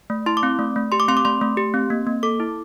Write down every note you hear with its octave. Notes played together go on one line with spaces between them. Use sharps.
A3
E4 C6
D6
C4
A3
A3
G4 C6
D6
C4 C6
D6
A3 C6
A3
G4
C4
A#3
A#3
A4 D6
E4